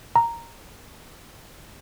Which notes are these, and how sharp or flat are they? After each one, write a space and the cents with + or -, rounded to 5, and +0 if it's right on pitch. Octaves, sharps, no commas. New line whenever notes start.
A#5 -5